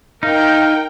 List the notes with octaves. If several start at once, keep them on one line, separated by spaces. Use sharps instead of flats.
D#4 A#4 F5 G5